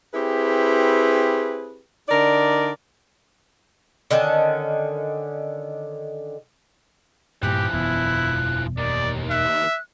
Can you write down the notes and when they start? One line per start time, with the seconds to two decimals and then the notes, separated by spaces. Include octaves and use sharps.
0.13 C4 E4 G4 G#4 B4
2.09 D3 D#4 A#4 D5
4.11 D3 D#3 C#4 A5
7.43 G2 A#2 E3 F3 G4 F#6
7.73 E1 F#2 B3 E4
8.78 D#2 D#3 D5
9.31 E5 F#6